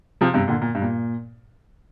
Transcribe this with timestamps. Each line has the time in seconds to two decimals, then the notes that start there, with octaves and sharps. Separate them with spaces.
0.21 C3 F3
0.34 G2 C3
0.48 A#2 D3
0.62 A#2
0.75 G2
0.82 A#2